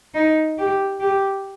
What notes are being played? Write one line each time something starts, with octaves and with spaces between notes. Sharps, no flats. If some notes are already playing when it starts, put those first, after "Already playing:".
D#4
G4
G4